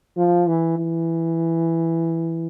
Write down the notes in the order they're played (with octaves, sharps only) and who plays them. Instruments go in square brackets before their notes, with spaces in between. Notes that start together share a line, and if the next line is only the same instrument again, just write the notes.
[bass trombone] F3
E3
E3